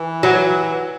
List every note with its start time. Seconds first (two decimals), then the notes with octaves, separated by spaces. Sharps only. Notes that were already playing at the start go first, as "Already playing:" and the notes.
Already playing: E3
0.23 F#3